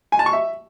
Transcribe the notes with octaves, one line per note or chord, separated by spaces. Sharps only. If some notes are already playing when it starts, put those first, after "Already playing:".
G#5
A5
C#6
E5